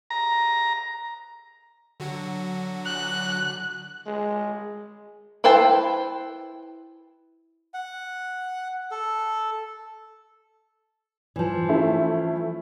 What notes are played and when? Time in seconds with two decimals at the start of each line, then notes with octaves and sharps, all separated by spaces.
0.11 A#5
2.00 D3 F#3 F#4
2.85 F#6
4.07 G#3
5.44 E4 B4 C5 G5 A5
7.74 F#5
8.91 A4
11.36 E3 F3
11.69 A3 C#4 E4